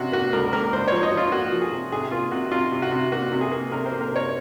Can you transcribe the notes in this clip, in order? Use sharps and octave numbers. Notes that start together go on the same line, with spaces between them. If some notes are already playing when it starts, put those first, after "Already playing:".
Already playing: C3 F#4
A#3 F#4
C#2 A#4
A#3 A#4
C#2 C5
F3 C#5
D#5
F3
F4
A#3 F#4
F3
G#4
C3
C3 G#4
A#3 F4
C3 F#4
C3 F4
C3
F#4
C3
A#3 F#4
C3
G#4
A#3
C3 A#4
C5
A#3
A#4
C3 C#5